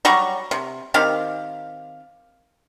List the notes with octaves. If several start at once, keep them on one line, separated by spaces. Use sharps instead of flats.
F#3 G3 A#5 C#6
C3
D#3 C4 G4 F5